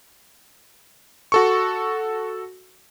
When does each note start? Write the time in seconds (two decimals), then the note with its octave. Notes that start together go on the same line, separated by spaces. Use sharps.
1.32 F#4 A4 C#6